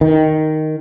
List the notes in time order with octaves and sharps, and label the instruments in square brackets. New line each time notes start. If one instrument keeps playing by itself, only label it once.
[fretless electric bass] D#3